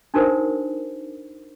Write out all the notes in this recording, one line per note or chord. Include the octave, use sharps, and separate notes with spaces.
D4 D#4 F#4 A4 A#4 C5